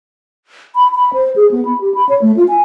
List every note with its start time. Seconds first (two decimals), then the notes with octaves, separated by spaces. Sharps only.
0.75 B5
0.95 B5
1.14 C5
1.36 G#4
1.51 B3
1.65 B5
1.81 G4
1.95 B5
2.09 C#5
2.22 A3
2.37 F4
2.48 G#5